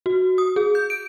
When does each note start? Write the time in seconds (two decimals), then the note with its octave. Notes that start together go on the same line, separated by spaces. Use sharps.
0.06 F#4
0.38 D#6
0.56 G#4
0.75 G6
0.90 D7